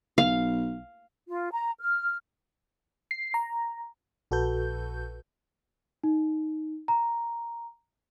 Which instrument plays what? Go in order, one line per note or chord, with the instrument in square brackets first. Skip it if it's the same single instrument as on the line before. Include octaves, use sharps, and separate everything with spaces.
[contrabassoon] B1 [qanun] F5
[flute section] F4
A#5
F6
[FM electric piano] C7
A#5
A#1 F#4 A4 B4 G6
[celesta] D#4
A#5